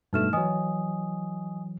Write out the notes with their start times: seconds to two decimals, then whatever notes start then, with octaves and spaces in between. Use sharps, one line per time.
0.13 G2 B2 A3 D#4 F6 E7
0.33 E3 F#3 D#5 G#5 D#6